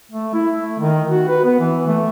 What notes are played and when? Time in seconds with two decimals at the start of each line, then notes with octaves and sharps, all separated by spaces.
0.12 A3
0.34 E4
0.59 A3
0.79 D#3
1.09 F#4
1.28 B4
1.45 B3
1.60 E3
1.88 A3